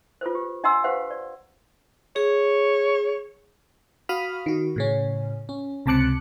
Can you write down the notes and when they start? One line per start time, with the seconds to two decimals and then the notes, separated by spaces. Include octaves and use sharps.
0.21 F4 A4 B4 C5
0.35 G4
0.64 D4 D#5 F#5 A#5 C6 E6
0.84 G4 B4 C5 F5 F#5
1.11 D5
2.16 G#4 C#5
4.09 F#4 F5 B5 D#6 F6
4.46 D#3 F#4
4.76 A2 C#3 C#4
5.49 C#4
5.86 C#2 C3 A5 D6 F#6 C#7